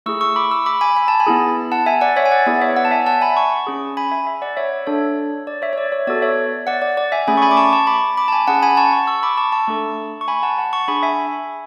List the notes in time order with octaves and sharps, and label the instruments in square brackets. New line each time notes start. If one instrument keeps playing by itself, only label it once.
[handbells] A3 E4 G#4 C#6 E6
C#6 E6
B5 D6
C#6 E6
B5 D6
G#5 B5
B5
A5
G#5 B5
B3 E4 G#4
F#5 A5
E5 G#5
D5 F#5
C#5 E5
G#5
D5 F#5
B3 E4 G#4 D5
C#5 E5
D5 F#5
A5
E5 G#5
F#5 A5
G#5 B5
A5 C#6
C#4 G#4
G#5 B5
E5 G#5
E5 G#5
D5 F#5
C#5 E5
D5
D4 A4 C#5
D5
C#5 E5
C#5
D5
C#5
B3 F#4 A4 D5
C#5 E5
D5 F#5
D5
D5
E5 G#5
A3 C#4 G#4 G#5 B5
C#6
G#5 B5
D6
A5 C#6
A5 C#6
B5 D6
B5 D6
A5
G#5 B5
C#4 G#4 F#5 A5
G#5 B5
A5 C#6
A5 C#6
C#6 E6
B5 D6
A5 C#6
A5 C#6
A3 D4 A4
C#6
G#5 B5
F#5 A5
F#5 A5
A5 C#6
D4 G#4 G#5 B5
E5 G#5